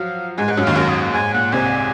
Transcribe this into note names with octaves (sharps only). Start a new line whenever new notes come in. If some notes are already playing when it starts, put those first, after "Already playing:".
Already playing: F3 F#3 F#4 F5
G#2 G#3 G#5
G#2 G#3 F#5
F#2 F#3
D#2 D#3 F5
F#2 F#3 A#4
G#4
G#2 G#5
A#2 F#5
C2 C3 G#5